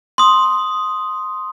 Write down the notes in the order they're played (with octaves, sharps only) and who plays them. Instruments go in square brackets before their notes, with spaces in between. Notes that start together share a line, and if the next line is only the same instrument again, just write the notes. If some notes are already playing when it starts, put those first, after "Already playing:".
[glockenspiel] C6 D#6